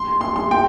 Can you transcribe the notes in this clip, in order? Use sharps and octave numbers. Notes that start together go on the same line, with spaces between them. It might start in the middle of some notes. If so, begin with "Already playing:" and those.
Already playing: C6
C6
C6
G5